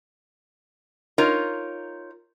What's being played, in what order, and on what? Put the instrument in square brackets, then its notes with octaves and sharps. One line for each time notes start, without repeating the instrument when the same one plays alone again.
[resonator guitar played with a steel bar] D#4 F4 A#4 C#5